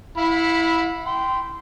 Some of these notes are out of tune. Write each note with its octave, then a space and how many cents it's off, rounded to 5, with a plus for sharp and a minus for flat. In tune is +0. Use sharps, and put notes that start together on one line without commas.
E4 +0 F5 +45 B5 -5
G5 -10 C6 -15